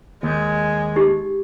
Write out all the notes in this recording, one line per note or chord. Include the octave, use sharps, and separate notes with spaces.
D#2 G#3
D#4 G4